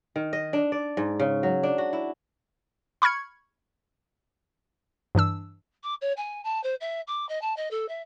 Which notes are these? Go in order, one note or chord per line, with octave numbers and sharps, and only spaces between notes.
D#3
D#5
D4
D5
G#2
C#3
F#3
D4
F#4
E4
B5 C#6 F6 G#6 C#7
G2 E3 D4 E6
D6
C#5
G#5
A5
C5
E5
D6
D#5
A5
D#5
A4
E5